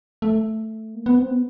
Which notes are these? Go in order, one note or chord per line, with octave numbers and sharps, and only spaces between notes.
A3
A#3
B3
C4
B3